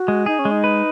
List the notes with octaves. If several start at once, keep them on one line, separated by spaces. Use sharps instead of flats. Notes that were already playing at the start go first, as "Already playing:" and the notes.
Already playing: F#4
G#3
D#4 G#4
C#4
G#3
D#4
B4